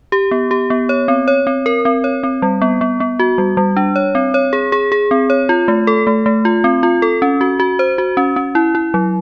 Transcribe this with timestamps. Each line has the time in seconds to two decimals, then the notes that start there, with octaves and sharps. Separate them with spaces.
0.12 G4
0.31 B3
0.51 G4
0.70 B3
0.89 C#5
1.08 C4
1.28 C#5
1.47 C4
1.66 A#4
1.85 C4
2.04 C#5
2.23 C4
2.42 G3
2.62 B3
2.81 B3
3.00 B3
3.19 F#4
3.38 G3
3.57 G3
3.76 D4
3.96 C#5
4.15 C4
4.34 C#5
4.53 G#4
4.72 G#4
4.92 G#4
5.11 C4
5.30 C#5
5.49 F4
5.68 A3
5.87 A4
6.07 A3
6.26 A3
6.45 F4
6.64 C4
6.83 F4
7.02 A4
7.22 C#4
7.41 F#4
7.60 F#4
7.79 C5
7.98 F#4
8.17 C#4
8.36 C#4
8.55 E4
8.75 E4
8.94 F#3